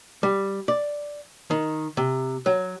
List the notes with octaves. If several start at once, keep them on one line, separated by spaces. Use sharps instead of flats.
G3
D5
D#3
C3
F#3